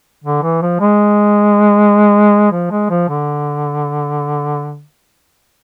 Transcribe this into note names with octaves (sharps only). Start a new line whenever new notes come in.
D3
E3
F3
G#3
F3
G#3
F3
D3